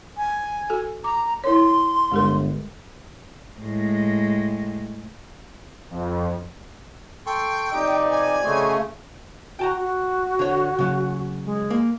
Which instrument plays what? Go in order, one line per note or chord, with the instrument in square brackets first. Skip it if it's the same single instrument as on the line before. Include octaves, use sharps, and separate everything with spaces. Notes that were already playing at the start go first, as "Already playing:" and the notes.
[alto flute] G#5
[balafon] F#4 A4
[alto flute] A#5 [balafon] D6
[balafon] E4 A#4 C#5 [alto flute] C6
[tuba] G1 [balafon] G#3 G4 A#4
[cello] A2 G#3
[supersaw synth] F2
[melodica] A4 C6 C#6 [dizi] G5
[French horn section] F2 C3 D5 [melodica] D#4 G4 D#5
[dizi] G#5
[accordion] C#3 A3 [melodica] F#4 D#5 C6
[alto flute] F#4 [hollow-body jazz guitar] G5 A5 A#5
[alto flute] F#4
[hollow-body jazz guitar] D3 C#5
C#3 F#3
[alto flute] G#3
[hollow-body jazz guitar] A#3